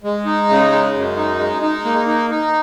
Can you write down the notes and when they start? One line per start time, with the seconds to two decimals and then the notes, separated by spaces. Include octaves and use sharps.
0.04 G#3
0.26 D#4
0.49 C#3
0.71 G#3
0.94 F#2
1.17 D#4
1.39 G#3
1.62 D#4
1.85 A#3
2.07 D#4
2.30 D#4